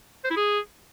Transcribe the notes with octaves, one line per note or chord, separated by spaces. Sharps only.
C5
E4
G#4